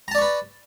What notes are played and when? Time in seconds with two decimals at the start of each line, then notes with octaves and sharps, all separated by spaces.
0.08 A#5
0.11 A5
0.15 D5
0.18 C#6
0.21 B4